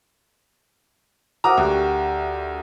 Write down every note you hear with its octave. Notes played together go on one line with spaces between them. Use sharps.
F#4 A#4 C5 E5 A#5 D6 D#6 F6
D2 G4 G5 F#6